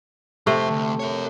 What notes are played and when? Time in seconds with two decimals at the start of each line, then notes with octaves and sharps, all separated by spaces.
0.47 F2 C3 A3 C5
0.71 D2
1.00 A#4 C#5